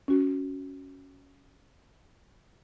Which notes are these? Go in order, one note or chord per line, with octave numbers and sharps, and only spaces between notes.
C#4 F#4